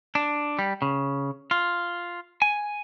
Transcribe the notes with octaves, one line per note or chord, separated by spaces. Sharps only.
D4
G3
C#3
F4
G#5